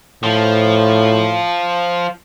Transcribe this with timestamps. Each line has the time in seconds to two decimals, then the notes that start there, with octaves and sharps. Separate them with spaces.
0.23 A2 F3